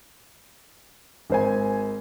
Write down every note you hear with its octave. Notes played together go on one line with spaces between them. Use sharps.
G#1 C5 G#5